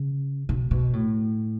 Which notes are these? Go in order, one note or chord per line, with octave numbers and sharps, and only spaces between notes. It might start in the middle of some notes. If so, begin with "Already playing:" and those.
Already playing: C#3
B2
B2
A2